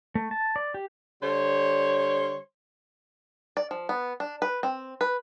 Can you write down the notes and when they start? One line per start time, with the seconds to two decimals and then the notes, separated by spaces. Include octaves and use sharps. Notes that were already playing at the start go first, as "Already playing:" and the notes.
0.15 A3
0.31 A5
0.56 D5
0.74 G4
1.23 D3 G3 C5 C#5
3.57 D5
3.71 F3
3.89 B3
4.20 D4
4.42 B4
4.63 C4
5.01 B4